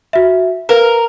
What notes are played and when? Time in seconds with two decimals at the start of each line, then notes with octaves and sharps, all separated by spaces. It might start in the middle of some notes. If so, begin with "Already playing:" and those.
0.13 F#4 E5
0.69 A#4 B4 F5